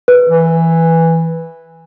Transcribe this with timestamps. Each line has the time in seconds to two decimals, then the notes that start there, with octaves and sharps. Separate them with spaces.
0.08 B4
0.29 E3